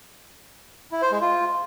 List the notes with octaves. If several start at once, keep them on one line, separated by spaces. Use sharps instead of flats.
E4
C5
G#3
F4